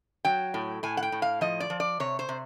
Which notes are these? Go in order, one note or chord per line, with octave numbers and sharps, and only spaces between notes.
F#3 G5
A2
A2 G#5
F#5
G5
A2
F5
F3 D#5
D5
F3
D5
C3 C#5
C5
C3